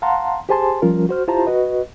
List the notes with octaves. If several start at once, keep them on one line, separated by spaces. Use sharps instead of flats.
F5 F#5 A5 A#5 C6
G4 G#4 C5 G#5 A5 C6
F3 G3 C#4 F4 A#4
F#4 C5 F6
E4 F4 G4 C5 A5 A#5
F#4 B4 D#5